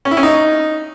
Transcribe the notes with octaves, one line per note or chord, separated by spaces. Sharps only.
C#4
E4
C#4
D#4